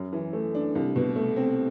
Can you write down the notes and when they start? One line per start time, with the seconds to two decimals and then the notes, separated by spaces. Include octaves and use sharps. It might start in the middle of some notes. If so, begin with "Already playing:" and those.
Already playing: F#2
0.13 E3
0.33 A3
0.55 D4
0.75 C2
0.96 B2
1.16 A3
1.36 C4